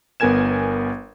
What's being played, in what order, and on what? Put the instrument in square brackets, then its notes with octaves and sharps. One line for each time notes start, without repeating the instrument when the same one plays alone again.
[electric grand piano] G1 B3 A#4 G#5 G#6 E7